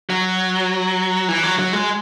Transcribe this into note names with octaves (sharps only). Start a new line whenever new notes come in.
F#3
E3
F#3
F#3
G#3